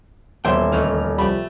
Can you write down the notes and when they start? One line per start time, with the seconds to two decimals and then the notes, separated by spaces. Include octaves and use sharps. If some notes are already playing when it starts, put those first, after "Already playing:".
0.45 D#1 B2 E3 G4 C5 E5 G5
0.72 D2 D#3 E3 A3 F6
1.18 C2 F3 G3 A3 G4 B5